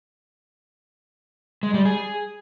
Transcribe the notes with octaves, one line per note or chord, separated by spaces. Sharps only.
G#3
G3
G#4